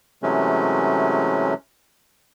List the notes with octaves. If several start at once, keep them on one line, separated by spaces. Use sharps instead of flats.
C3 E3 F#3 G#3 A3 C#4